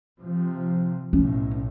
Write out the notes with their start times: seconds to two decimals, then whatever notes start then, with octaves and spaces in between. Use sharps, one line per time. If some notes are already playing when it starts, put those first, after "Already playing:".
0.20 C3 F3
1.13 B1 A2 C#4